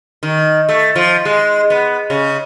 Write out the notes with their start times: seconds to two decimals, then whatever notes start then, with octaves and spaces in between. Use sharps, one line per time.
0.23 D#3
0.69 A3
0.96 F3
1.25 G#3
1.70 B3
2.10 C#3